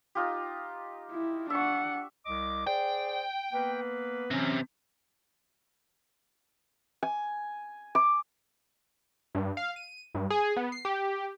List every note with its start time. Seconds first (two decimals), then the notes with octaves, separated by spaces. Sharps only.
0.15 D#4 F4 G4
1.11 E4
1.50 D4 E5 F#5 C#6
2.26 C2 D#5 D6
2.67 G#4 C5 D5 G5
3.54 A#3 B3 B4
4.31 C3 E3 F#3 C#4
7.03 G#5
7.95 D6
9.35 G2
9.57 F5
9.76 D#7
10.15 G2
10.30 G#4
10.56 B3
10.72 C7
10.85 G4